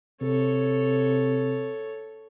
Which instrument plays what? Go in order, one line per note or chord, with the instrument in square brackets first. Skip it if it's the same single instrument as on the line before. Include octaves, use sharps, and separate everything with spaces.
[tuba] C3 [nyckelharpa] A4 C#5